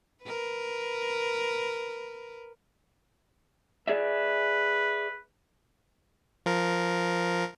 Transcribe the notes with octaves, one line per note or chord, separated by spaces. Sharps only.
A#4 B4
G#4 B4 D5 E5
F3 A#4